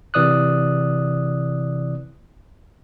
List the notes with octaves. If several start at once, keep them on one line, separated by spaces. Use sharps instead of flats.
C3 E3 D5 D#6 F#6